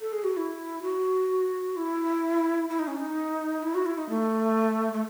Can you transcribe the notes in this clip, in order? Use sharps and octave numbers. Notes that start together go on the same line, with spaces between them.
A4
G#4
F#4
E4
F#4
E4
E4
D#4
C#4
D#4
E4
F#4
E4
D#4
A3
A3